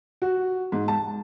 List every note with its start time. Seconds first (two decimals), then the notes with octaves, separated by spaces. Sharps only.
0.22 F#4
0.72 G#2
0.88 A5